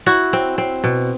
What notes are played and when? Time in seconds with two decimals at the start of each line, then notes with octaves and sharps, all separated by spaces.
0.06 E4 F#4
0.33 C4
0.58 C4
0.84 B2